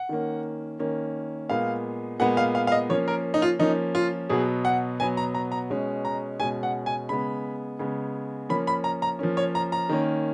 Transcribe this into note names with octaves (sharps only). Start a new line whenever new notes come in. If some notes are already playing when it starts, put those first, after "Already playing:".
Already playing: F#5
D#3 A#3 C#4
D#3 A#3 C#4
A#2 G#3 B3 F5
A#2 G#3 B3 F#5
F5
F5
F5
D#5
F3 A#3 C#4 C#5
A#4
D#4
F4
F3 A#3 C#4 D#4
F4
B2 F#3 B3 G#4
F#5
B2 F#3 B3 G#5
A#5
A#5
A#5
B2 G#3 C#4
A#5
B2 G#3 C#4 G#5
F#5
G#5
C#3 G#3 B3 B5
C#3 G#3 B3
F3 A#3 C#4 B5
B5
A#5
A#5
F3 A#3 C#4
C#5
A#5
A#5
D#3 A#3 C#4